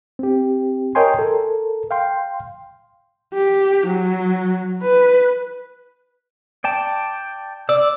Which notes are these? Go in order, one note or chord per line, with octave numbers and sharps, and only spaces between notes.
C4 G4
A#4 C#5 D#5 G5 G#5 C6
A4 A#4
F5 G5 C6
G4
F#3
B4
D5 G5 A5
D5 E6